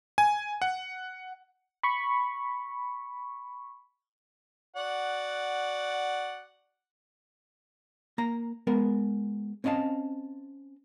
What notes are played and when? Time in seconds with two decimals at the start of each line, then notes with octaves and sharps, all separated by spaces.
0.18 G#5
0.62 F#5
1.83 B5 C#6
4.77 F#4 D5 F#5
8.18 A#3 A#5
8.67 G#3 B3 A#4
9.64 C4 C#4 D#5 F5 A5